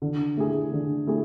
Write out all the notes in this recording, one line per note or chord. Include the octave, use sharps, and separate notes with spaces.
D3
A3 E4 G#4
D3
A3 E4 G#4